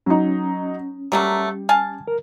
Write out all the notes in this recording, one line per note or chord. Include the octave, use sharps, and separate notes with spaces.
F#3 C#4 D#4
F#3 G3 A3 A#3
F5 G#5 A5
A#4